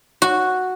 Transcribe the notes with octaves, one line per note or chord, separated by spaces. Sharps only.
F#4